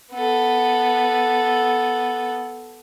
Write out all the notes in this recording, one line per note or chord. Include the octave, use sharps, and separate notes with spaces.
B3 A4